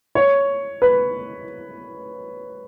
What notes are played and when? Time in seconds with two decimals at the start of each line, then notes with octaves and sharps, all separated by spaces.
0.15 C#5
0.82 B4